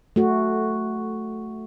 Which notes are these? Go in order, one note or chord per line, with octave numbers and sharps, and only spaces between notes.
A3 F#4